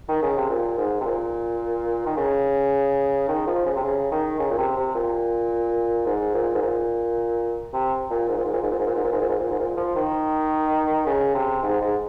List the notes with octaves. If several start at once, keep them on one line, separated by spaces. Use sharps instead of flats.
D#3
C#3
C3
A#2
G#2
C3
A#2
D#3
C#3
D#3
F3
C#3
C3
C#3
D#3
C#3
A#2
C3
C3
A#2
G#2
A#2
G#2
A#2
C3
A#2
G#2
A#2
G#2
A#2
G#2
A#2
G#2
A#2
G#2
A#2
G#2
A#2
G#2
A#2
G#2
A#2
F3
D#3
C#3
C3
G#2
G#2